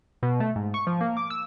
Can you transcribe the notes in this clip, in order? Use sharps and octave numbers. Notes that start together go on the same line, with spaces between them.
B2
A3
G#2
C#6
F3
A#3
D6
E6